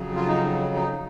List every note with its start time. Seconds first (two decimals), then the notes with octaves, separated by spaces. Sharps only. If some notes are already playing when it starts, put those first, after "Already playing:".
Already playing: F2 C#3 F#3
0.16 F4
0.28 D#4
0.75 D#4